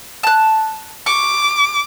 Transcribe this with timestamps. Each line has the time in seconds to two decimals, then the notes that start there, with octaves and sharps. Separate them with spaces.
0.23 A5 F#6
1.06 C#6 D6